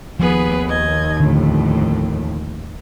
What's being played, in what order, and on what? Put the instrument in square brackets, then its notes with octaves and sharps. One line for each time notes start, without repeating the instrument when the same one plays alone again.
[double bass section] D#2 [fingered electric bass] F3 [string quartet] B3 G#4 B4
[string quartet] D#5 G#6
[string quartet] F2 A2 [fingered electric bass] D3